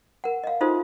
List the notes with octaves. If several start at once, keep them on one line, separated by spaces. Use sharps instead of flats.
A#4 F#5
D#5 F5
D#4 F4 F#4 A4 C5 E5